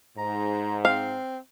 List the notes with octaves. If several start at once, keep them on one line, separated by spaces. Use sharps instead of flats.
G#2 A#5
C4 F5